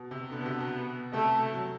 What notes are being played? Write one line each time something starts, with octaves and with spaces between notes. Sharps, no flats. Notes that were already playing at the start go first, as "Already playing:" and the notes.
Already playing: B2
C3
D3 B3
B2
C3
B2
C3 A3
F#3